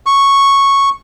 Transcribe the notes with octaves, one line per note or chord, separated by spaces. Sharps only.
C#6